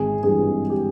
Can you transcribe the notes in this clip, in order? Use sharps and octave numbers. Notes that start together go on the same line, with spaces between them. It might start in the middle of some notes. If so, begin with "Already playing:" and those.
Already playing: G#1 G#4
G2 E3 G#4
G4